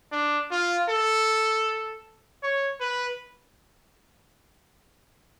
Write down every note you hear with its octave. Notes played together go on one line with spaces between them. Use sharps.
D4
F4
A4
C#5
B4